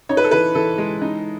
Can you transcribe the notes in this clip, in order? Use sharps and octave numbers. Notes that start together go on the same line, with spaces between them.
D#4 C#5
B4
A4
E3 B4
E3 A4
G#3
D#4